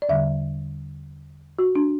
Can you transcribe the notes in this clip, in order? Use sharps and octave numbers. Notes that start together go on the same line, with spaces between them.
D5
E2 D3 G3 E5
F#4
D4